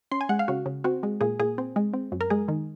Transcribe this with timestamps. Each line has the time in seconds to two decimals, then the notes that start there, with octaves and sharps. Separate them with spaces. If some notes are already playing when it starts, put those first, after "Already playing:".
0.12 C#4 C6
0.21 G#5
0.29 G#3 F#5
0.39 F5
0.48 C#3 F#4
0.66 C#3
0.84 C4 F#4
1.03 G#3
1.21 A#2 G#4
1.40 A#2 G#4
1.58 C4
1.76 G#3
1.94 C4
2.12 F#2
2.21 A#4
2.30 G#3 G#4
2.48 D#3